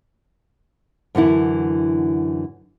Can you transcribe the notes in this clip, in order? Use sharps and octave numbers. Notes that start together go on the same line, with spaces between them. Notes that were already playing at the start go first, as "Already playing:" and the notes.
F#2 D3 E3 E4